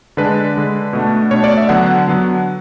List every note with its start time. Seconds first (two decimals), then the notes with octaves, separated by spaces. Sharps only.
0.17 D3 G#3 D4 B4
0.56 D3 G#3 D4
0.93 B2 A3 D4
1.31 B2 A3 D4 C#5
1.44 D5
1.57 E5
1.69 D3 F#3 B3 F#5
2.08 D3 F#3 B3